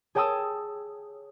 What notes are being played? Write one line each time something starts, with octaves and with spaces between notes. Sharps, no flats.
G#4 C#5 G5 A5 D#6 E6